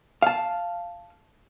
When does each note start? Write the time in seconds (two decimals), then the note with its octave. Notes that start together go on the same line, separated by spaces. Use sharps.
0.22 F5 A5